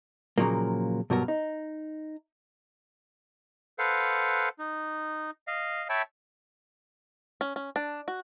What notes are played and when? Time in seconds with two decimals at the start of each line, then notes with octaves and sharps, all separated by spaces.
0.38 A#2 C#3 F3 F#3 A#3
1.10 G2 B2 F#3 A#4
1.28 D#4
3.79 A4 B4 C5 F5 F#5
4.59 D#4
5.47 D#5 F5
5.90 C#5 E5 G5 A5 B5
7.41 C#4
7.56 C#4
7.76 D4
8.08 F#4